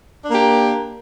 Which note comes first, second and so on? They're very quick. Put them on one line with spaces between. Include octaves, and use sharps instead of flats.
D4 A#3 G4